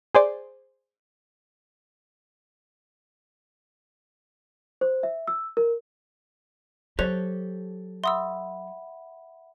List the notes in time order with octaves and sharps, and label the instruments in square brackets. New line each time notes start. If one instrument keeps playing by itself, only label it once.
[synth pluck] G#4 C5 D5
[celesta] C5
E5
E6
A#4
[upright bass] F#3 [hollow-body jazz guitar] G4 A4 C#5 [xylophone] C5 F#6 F7
[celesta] E5 F#5 B5 [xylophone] C6 D#6 E6